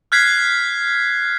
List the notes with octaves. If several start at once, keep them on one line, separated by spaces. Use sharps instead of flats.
F6 F#6 G#6 B6 C7